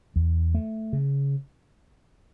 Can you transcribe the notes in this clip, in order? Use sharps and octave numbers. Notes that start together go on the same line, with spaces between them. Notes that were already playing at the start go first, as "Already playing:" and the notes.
E2
A3
C#3